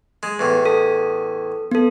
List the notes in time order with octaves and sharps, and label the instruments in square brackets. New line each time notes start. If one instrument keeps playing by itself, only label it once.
[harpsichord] G#3
E2 A2
[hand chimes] A4
B3 A4